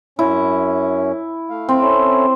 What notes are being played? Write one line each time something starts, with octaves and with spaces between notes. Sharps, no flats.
F#2 C#4 E4
A3 F5
C4
C#4 E4 A4